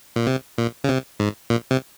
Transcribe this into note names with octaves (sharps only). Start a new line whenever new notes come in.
A#2
C3
A#2
C#3
C3
G#2
A#2
C3